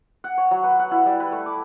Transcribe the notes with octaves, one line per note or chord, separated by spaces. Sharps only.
F#5
C#5
F#3
B4
F#5
E4
G3
B4
A3
D6